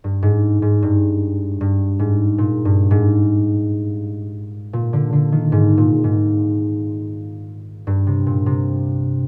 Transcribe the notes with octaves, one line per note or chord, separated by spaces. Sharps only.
G2
G#2
G#2
G2
G2
G#2
A#2
G2
G#2
A#2
D3
D3
D#3
G#2
A#2
G#2
G2
C3
A#2
C3